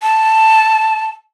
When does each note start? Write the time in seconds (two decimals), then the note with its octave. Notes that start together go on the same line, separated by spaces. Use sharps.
0.02 A5